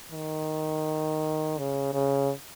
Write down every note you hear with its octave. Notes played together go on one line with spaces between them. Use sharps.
D#3
C#3
C#3